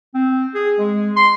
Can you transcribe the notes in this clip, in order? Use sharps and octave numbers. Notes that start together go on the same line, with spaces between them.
C4
G#4
G#3
C6